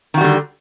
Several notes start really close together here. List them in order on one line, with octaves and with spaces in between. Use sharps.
D#3 F#4 G3 D3